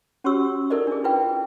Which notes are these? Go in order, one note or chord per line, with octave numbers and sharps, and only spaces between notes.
C#4 F#4 G4 C#5 C#6 E6
D#4 E4 A4 A#4 D5 D#5
D4 G#4
E4 F4 B4 F5 G5